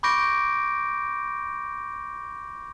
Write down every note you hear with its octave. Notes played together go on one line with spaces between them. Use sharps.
B5 C#6 D6 G6 A#6 D7